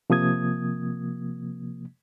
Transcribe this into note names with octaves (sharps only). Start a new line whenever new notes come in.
C3 F3 A#3 D#6 G#6